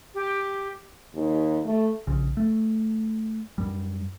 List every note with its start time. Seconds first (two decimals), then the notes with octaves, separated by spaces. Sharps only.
0.14 G4
1.15 D#2
1.65 A3
2.07 A#1 C#3
2.37 A3
3.58 F#2 G3